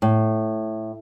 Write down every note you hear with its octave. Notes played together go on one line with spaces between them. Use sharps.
A2